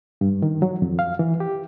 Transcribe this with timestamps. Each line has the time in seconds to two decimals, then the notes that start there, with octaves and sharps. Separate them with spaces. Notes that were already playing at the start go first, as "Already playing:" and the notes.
0.21 G2
0.42 D#3
0.62 F#3
0.82 F2
0.99 F5
1.19 E3
1.40 G4